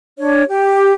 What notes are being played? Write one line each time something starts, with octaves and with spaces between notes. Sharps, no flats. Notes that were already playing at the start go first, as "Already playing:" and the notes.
D4 C#5
G4